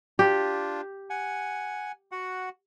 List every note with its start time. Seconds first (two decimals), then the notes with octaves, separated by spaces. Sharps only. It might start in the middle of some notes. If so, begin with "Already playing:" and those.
0.19 D4 F4 G4
1.10 F#5 G#5
2.12 F#4 F#5